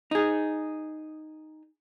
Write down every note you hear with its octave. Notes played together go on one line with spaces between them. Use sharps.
D#4 G#4